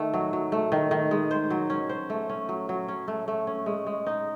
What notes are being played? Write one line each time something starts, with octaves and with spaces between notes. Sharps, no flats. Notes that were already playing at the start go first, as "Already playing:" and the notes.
Already playing: D#3 A3
F#3
F#3
A3
D#3
D#3
G#3
C5
F#3
C#4
C5
A3
C#4
F#3
F#3
C#4
A3
A3
C#4
G#3
G#3
D#4